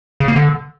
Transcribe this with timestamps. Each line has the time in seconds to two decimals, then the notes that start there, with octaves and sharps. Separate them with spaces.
0.20 C#3
0.28 A#3
0.36 D3